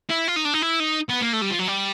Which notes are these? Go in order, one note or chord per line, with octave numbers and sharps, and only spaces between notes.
E4
F4
D#4
D4
D#4
E4
D#4
B3
A#3
A3
G3
F3
F#3
G3